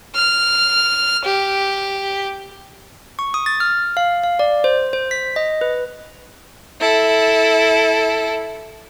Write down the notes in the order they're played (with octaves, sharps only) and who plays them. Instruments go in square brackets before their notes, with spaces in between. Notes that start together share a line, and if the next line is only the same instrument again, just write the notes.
[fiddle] F6
G4
[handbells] C#6
D#6
A6
F6
F5
F5
D5
C5
C5
B6
D#5
B4
[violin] E4 A4